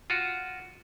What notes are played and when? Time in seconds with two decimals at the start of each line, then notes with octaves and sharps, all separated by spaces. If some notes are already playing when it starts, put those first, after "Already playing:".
0.10 F4 F#4